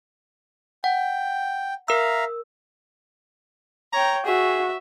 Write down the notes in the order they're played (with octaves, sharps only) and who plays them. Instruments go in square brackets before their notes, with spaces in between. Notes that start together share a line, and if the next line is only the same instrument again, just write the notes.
[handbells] F#5 [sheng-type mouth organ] G5
[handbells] A#4 E6 [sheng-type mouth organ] E5 F5 A#5
[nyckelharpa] C#5 G5 [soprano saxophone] A#5
[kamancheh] F#4 [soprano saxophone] G#4 [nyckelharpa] E5